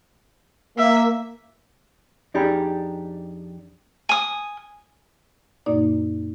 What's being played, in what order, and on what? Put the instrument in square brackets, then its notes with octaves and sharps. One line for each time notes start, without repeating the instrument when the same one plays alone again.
[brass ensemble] A#3 [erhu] E5
[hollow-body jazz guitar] F2 D4 D#4 G4 G#4 B5
[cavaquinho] G#5 D#6
[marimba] F#2 A#2 A#3 D#4 D5